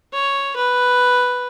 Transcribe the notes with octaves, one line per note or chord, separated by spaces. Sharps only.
C#5
B4